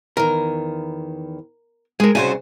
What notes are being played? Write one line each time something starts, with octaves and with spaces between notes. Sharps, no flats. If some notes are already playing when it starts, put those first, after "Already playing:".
E2 D#3 A#4
G#3 G#4 A#4
C2 C#3 E4 F#4 C5 G#5